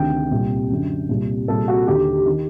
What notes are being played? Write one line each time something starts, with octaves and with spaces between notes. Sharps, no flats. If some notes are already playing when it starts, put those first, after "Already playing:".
Already playing: D2 C3 D#3 G5
C2 A#2
F#2 D3
C2 A#2
C2 A#2 A4
F#4
D#2 D3 G4
D#3